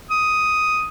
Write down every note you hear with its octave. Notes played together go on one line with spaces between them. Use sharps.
D#6